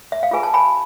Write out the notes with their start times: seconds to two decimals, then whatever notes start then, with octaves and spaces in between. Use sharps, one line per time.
0.12 E5
0.23 F5
0.31 F4 G#4 B4 G#5
0.43 A5
0.54 G#5 B5